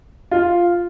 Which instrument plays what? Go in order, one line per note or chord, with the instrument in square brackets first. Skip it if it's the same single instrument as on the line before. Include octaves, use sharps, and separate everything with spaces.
[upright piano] F4